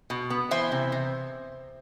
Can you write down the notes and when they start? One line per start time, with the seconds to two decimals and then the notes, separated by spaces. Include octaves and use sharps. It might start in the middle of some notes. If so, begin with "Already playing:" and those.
0.10 B2
0.30 B3
0.51 E3 C5 E5
0.72 C3
0.92 C3